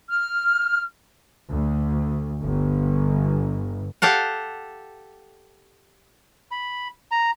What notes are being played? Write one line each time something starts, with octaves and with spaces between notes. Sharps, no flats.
F6
D2
G1
G4 A4 F5 F#5
B5
A#5